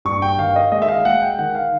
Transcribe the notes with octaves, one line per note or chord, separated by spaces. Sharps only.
G2 C#6
G5
D#3 F5
D#5
G#3 D#5
E5
F5
G#3 F#5
G5
D#3 F#5
F5